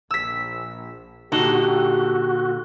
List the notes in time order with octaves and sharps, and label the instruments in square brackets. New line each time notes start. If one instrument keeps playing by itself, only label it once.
[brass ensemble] A#1 [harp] E6 B6
[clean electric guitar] A#2 D3 A4 [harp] D#4 [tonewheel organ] F#4 [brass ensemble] G4